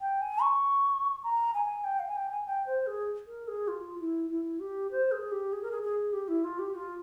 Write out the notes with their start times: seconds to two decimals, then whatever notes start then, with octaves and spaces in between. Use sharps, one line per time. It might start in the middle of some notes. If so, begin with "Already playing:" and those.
0.01 G5
0.21 G#5
0.42 C#6
1.24 A#5
1.54 G#5
1.84 G5
2.00 F5
2.08 G#5
2.16 G5
2.31 G#5
2.47 G5
2.67 C5
2.87 G#4
3.27 A#4
3.48 G#4
3.68 F4
4.00 E4
4.30 E4
4.60 G4
4.91 C5
5.12 G#4
5.32 G4
5.53 G#4
5.63 A#4
5.71 G#4
5.82 G#4
6.13 G4
6.28 E4
6.44 F4
6.59 G4
6.75 F4